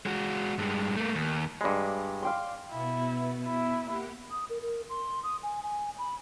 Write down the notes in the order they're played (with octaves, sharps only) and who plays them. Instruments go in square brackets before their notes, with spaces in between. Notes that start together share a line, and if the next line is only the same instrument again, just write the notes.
[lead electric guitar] G#3 F#4
G2 G#3
A3 A#3
D#2
[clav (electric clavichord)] G2 G#3 [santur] D5 B5
[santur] F5 G5 C6
[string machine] B2 B3 [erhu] E4
[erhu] E4
[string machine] A#3 G4 F#5
[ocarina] D#6
A#4
A#4
C6
D#6
G#5
G#5
B5